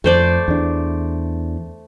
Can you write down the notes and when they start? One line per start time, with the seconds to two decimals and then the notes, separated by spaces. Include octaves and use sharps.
0.04 F2 A3 C5 D5
0.48 E2 D4